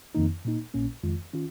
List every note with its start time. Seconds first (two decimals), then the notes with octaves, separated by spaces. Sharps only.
0.15 F2 D#3 A#3 D#4
0.45 A#2 A#3 D#4
0.74 A#1 A#2 A#3 C#4
1.03 F2 D#3 G#3 F4
1.34 D#3 C#4 F4